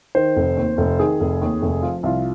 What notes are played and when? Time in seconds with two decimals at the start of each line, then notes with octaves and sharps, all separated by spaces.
0.15 D#3 C5
0.36 F1
0.57 D#2
0.78 F1
0.99 D#3 G#4
1.20 F1
1.41 D#2
1.62 F1
1.82 F3 F4
2.03 C2 F4